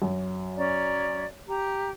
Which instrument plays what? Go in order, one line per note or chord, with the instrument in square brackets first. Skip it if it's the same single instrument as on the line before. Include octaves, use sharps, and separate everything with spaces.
[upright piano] F#2
[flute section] C#4 D5 A#5
G4 A#5